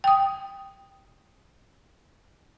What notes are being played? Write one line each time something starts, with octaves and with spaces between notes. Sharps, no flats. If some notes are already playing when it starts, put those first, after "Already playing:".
G5 D#6